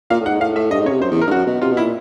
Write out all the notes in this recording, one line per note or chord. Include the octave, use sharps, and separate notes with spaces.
A#2 F5
A2
G#2 F#5
A2 F5
A2 E5
G2 D#5
G#2
C#3 C#5
C3
F#2 C5
E2
A#4
G2
F#2 F#4
B2
C3 F4
B2
E4
A#2